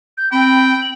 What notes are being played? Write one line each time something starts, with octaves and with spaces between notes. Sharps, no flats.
G6
C4 G5 B5
F#7